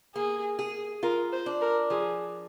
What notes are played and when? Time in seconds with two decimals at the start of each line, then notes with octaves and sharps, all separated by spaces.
0.15 A#3 G#4
0.59 G#4
1.03 F4 A#4
1.32 C5
1.46 D4
1.61 A#4
1.90 F3 G#4